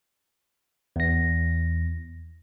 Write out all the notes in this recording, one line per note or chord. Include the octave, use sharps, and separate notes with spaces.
E2 A#6